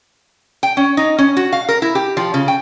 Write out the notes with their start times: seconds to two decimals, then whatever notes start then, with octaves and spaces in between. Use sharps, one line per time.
0.63 G5
0.77 C#4
0.97 D#4
1.18 C#4
1.37 F#4
1.53 F5
1.69 A#4
1.82 E4
1.95 G4
2.17 F3
2.34 C#3
2.48 G5